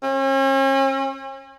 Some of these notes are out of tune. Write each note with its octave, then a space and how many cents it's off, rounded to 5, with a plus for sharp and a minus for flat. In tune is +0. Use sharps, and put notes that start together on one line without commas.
C#4 -40